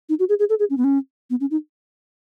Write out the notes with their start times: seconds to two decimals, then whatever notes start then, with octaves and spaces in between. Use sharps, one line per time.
0.09 D#4
0.19 F#4
0.29 G#4
0.39 G#4
0.49 A4
0.59 G#4
0.70 C#4
0.77 B3
0.84 C#4
1.30 B3
1.41 C#4
1.51 D#4